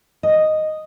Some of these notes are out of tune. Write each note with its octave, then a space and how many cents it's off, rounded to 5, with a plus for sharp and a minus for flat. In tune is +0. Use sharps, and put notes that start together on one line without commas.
D#5 -5